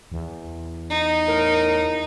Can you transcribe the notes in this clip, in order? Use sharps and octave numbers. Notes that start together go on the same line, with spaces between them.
E2
D#4
A2 A#4